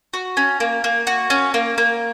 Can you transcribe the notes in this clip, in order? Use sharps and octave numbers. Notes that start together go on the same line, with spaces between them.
F#4
C#4
A#3
A#3
F#4
C#4
A#3
A#3